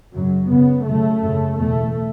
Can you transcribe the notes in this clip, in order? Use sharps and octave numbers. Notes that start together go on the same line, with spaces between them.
F#2 C#3 F#3
F#2 C#3 B3
F#2 C#3 A3
F#2 C#3
E2 B2 A3